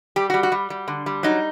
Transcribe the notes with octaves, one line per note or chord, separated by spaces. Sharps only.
G3 G4
G3 F#4
F#4
G3
G3
D3
G3
F#3 D#4